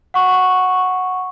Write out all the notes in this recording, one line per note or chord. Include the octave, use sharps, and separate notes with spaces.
F#5 C#6